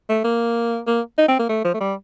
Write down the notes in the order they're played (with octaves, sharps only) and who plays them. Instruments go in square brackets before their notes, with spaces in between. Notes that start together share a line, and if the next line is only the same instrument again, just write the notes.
[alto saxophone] A3
A#3
A#3
D#4
C4
A#3
A3
F3
A3
G3